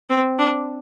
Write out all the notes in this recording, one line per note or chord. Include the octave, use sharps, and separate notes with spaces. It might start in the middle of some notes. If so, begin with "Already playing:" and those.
C4
D4